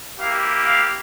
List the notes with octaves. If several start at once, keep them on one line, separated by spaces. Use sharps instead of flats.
A#3 E4 G4 F5
F5